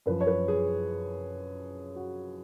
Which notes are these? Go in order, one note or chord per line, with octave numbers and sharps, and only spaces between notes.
F#2 F3 B4
C#5
B4
G#4
F#4